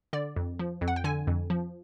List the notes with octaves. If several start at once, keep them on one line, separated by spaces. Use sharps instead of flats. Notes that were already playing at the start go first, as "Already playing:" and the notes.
D3 D5
F2
F3
F2
F#5
G5
D3 G#5
F2
F3